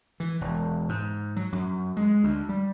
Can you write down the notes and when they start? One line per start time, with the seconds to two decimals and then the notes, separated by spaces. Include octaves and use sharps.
0.20 E3
0.41 E1
0.89 G#2
1.36 F#3
1.52 F#2
1.97 G#3
2.23 D2
2.49 G3